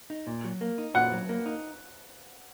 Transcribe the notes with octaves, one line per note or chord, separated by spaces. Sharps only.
D#4
A#2
F#3
A#3
D#4
A#2 F#5
F#3
A#3
D#4